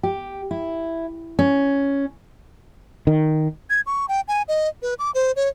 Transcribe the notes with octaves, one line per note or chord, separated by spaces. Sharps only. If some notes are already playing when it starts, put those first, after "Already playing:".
G4
E4
C#4
D#3
G#6
C#6
G5
G#5
D#5
B4
D6
C5
C#5